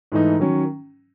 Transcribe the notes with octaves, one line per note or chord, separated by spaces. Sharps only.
G#2 E3 A3 D#4
D#3 F#3 C#4